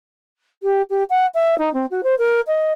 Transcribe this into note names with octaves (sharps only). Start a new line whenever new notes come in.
G4
G4
F#5
E5
D#4
C4
F#4
C5
A#4
D#5